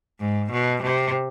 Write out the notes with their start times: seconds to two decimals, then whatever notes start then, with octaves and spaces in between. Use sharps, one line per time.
0.20 G#2
0.51 B2
0.82 C3